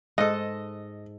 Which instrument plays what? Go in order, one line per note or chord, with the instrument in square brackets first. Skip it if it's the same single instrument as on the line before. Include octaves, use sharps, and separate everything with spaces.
[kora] G#2 A4 [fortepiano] D#5